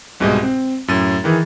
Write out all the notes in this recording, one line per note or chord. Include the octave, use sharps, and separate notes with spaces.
C2 G#2 B2 G#3 G4 D#5
C4
F#2 A2 A6 D#7
D#3 E3 G#4